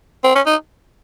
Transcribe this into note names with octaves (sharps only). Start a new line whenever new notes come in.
C4
C#4
D#4